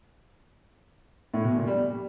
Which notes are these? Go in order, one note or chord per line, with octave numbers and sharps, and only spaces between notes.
A2
B2
A#2
G3